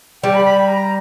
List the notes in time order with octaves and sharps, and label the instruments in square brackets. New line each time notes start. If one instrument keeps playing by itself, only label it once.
[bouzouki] G3 [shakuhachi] G5
[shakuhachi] B5
B5
A#5